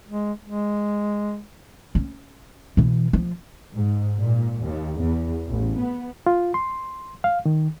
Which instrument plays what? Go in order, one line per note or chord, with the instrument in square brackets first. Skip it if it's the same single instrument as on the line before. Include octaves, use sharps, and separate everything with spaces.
[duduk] G#3
G#3
[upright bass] C#4
B2 E3
F3
[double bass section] G#2
A#2
D#2
E2
A1
B3
[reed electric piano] F4
C6
F5
D#3